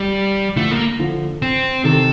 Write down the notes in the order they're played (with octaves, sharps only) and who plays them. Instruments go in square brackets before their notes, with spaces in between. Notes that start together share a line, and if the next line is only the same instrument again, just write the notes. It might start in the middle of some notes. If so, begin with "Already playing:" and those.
Already playing: [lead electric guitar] G3
[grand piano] D3 F3 [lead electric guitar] A3
[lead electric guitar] A#3
[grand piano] D3 F3
[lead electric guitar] C4
[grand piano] C3 D#3 [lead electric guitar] A4